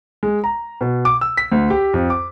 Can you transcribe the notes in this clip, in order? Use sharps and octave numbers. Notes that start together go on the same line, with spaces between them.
G#3
A#5
B2
D6
E6
B6
D2
G4
F2
D6